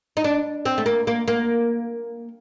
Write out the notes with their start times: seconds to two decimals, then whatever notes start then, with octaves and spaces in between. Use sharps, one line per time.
0.17 D#4
0.24 D4
0.66 C4
0.78 A3
0.86 A#3
1.07 A#3
1.28 A#3